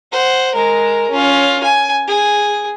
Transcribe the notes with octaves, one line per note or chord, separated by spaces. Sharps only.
C5 F#5
G#3 A#4
C#4 F4
G#5
G#4